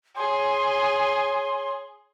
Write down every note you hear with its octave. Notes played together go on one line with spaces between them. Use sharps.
G#4 C#5 C6